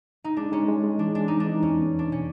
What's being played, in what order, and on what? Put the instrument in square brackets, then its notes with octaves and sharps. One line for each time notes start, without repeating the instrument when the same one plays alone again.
[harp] D#4
[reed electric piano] G#3 [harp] D4
[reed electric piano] G#3 [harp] C#4
[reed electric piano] G#3
G#3
[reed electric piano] E3 [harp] D4
[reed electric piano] G#3 [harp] D4
[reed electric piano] C4 [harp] D#4
[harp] D4
[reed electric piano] E3
[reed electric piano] E2 [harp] C#4
[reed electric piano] B3
E2
[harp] D4
[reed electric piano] B2 [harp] C#4